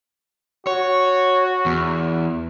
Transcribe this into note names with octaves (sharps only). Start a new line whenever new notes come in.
F#4 C#5
E2